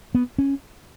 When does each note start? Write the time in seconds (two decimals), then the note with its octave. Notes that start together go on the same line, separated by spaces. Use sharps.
0.15 B3
0.38 C#4